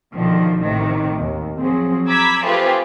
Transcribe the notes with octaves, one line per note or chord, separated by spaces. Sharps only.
B1 D3 D#3 F3
A1 A2 C3 D#3
D#2
F3 F#3 C4 G#4
A#5 B5 D6 E6 G#6 B6
A3 C4 F4 G4 G#4 B4